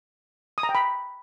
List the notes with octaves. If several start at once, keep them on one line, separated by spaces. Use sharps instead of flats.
D#6
A#5
G5
B5